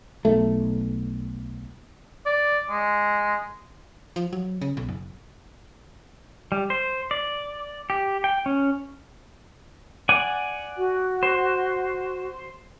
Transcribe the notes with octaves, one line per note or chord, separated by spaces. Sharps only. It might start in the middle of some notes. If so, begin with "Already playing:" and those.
B1 A3
D5
G#3
F3
F#3
C#3
B1
F#1
G3
C5
D5
G4
G5
C#4
D5 F#5 G#5
F#4
C5